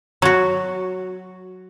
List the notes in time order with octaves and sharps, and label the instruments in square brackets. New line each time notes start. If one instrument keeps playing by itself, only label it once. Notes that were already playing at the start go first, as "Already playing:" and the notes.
[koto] F#3 F#4